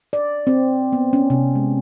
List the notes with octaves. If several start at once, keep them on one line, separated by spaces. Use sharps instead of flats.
D5
C4
B3
C#4
C3
G#3